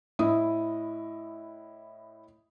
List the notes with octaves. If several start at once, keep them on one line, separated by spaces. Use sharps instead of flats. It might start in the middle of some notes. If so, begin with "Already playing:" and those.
A2 E4 D#5 D#6